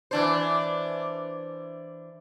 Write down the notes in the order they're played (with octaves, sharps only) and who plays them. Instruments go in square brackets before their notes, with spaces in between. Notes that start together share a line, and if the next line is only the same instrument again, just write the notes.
[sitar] E3 D4 C5